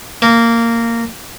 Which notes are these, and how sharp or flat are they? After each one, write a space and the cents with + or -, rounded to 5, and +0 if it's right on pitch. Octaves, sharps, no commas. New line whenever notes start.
A#3 -15